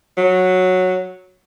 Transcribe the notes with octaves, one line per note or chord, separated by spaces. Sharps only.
F#3